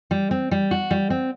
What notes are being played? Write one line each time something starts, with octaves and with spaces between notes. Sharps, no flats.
G3
C4
G3
F#4
G3
C4